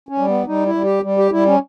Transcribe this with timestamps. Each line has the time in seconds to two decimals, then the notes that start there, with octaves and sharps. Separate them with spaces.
0.09 C#4
0.18 G3
0.28 B3
0.47 G3 D#4
0.66 E4
0.75 G3
0.84 G4
1.03 G3
1.18 G4
1.31 G3 E4
1.46 C#4